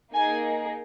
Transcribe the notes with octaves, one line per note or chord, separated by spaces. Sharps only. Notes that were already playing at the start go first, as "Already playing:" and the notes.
A#3 D#4 G#4 G#5